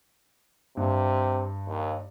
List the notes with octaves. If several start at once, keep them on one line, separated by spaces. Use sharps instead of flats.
G2 C3
D#2